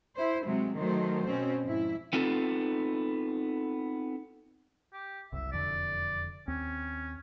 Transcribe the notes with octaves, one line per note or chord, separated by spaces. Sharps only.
E4 C5
C3 F#3 G#3
D#3 F#3 A3 C5
B2 C4 C#4
F2 G#2 E4
B3 C4 D#4 F4 A4
G4
F#1 C2 E5
E1 F2 D3 D5
D#2 C4 C#4